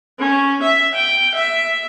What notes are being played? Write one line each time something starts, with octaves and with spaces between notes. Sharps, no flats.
C#4
E5
G5
E5